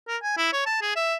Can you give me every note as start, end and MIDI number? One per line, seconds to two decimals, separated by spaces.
0.08 0.17 70
0.23 0.37 80
0.37 0.51 64
0.53 0.62 73
0.66 0.79 81
0.82 0.95 68
0.96 1.16 76